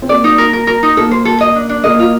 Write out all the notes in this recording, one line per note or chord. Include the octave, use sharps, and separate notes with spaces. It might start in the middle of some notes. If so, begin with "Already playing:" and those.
C4
A#3 D5
D#4
A#4
A#4
A#4
D#4
A#3 A4
C5
A4
D#5
D4
D4
A#3 D#5
F4